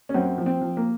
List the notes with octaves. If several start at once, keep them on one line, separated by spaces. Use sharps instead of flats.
C#4
F#2 C4
F3
C4
F3
A#3